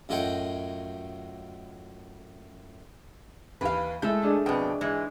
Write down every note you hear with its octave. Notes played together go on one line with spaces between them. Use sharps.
F#2 A2 F4 D#5 F#5 G5
D#2 E3 B4 F5
G#3 A3 E4 A4 E5 G6
D#3 D4 G#4
F2 B2 B3 G5
G#2 E3 G#3